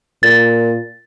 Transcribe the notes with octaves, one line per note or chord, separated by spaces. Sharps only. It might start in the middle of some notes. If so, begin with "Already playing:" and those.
A#2 A6